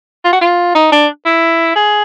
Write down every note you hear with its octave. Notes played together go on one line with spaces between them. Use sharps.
F4
F#4
F4
D#4
D4
E4
G#4